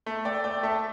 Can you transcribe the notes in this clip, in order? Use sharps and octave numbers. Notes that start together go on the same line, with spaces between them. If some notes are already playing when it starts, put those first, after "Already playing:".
A3
A3 D5 G5
A3 D5 G5
A3 E5 A5